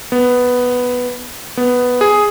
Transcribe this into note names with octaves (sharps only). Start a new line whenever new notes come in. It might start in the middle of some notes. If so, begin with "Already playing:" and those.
B3
B3
G#4